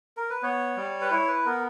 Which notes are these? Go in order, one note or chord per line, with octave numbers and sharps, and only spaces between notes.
A#4
B4
B3 C#5
G3
B4
E4 C#5
B4
B3 A#4